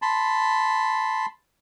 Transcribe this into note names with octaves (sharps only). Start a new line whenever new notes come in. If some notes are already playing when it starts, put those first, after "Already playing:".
A5 B5 C6